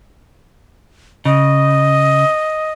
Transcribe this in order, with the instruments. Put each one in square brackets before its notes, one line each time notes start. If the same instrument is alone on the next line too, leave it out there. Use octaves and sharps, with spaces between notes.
[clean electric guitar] C#3 [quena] D#5